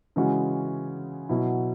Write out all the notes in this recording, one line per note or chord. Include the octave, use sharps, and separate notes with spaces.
C#3 E3 G#3 C#4 F#4
B2 F#3 E4